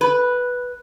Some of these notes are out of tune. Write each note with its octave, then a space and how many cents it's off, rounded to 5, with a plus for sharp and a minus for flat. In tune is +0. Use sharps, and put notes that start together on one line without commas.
B4 -5